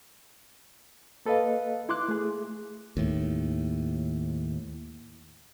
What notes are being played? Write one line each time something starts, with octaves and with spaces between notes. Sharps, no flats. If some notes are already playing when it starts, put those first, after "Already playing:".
A#3 A4 B4 D#5 F5
E4 C6 D6 F#6
A3 G#4
D#2 A2